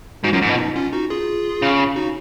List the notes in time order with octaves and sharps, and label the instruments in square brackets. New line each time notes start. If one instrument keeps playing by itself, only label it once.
[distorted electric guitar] G#2 [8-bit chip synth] D#4 F#4
[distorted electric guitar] F#2 [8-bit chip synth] C#4 F4
[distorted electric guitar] G#2 [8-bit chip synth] D#4
[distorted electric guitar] B2
[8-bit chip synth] F4
D#4
C#4 F4
D#4 F#4
F4 G#4
[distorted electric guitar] C#3
[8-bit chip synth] D#4 F#4